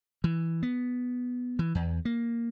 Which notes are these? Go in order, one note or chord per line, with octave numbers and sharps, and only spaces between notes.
E3
B3
E3
E2
A#3